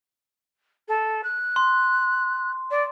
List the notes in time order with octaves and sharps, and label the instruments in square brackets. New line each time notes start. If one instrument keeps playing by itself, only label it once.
[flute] A4
F#6
[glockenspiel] C6
[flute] D5